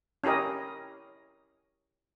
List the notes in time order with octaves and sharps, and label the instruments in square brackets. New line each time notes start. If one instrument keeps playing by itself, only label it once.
[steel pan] C#4 E4 G4 A#4 D#5